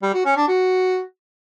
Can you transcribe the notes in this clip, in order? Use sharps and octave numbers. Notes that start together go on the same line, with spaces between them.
G3
F#4
C#4
D4
F#4